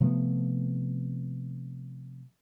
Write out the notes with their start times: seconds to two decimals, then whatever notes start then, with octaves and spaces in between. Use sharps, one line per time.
0.01 C3 F3 A3 B3